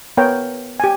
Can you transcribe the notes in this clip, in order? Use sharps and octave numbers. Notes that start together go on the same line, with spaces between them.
B3 A#4 C#5 G5
G4 G#5